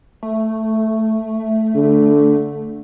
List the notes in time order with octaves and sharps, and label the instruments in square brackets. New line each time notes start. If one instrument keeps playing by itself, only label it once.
[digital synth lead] A3
[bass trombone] D3